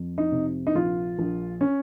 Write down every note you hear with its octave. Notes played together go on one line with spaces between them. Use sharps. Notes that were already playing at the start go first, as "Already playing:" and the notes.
Already playing: F2
D#4
C3
D#4
A#1 F4
A#1
C#4